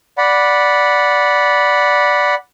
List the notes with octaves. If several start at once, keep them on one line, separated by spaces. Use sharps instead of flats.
D5 F#5 B5